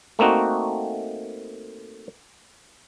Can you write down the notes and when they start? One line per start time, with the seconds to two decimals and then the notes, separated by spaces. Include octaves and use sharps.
0.19 A3 A#3 C4 D#4 F#4